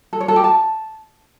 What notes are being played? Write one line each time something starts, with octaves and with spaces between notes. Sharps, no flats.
A4
C#5
A4
G4
A5